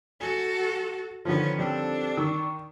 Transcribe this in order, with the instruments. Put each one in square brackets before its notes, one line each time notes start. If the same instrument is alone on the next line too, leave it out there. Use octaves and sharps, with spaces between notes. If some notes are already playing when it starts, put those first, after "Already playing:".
[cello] F#4 A4 [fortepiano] G#5
[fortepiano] D3 D#3 F3 [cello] B3 C#4
[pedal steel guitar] G3 C4 A4 [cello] D4
[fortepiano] D#3 [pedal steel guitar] C#6 D6 E6